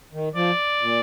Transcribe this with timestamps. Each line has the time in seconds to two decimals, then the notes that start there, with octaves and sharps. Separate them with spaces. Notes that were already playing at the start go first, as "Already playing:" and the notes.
0.13 D#3
0.35 F3 D5
0.81 A#2